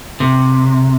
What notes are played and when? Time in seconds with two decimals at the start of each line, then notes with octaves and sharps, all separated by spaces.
0.20 C3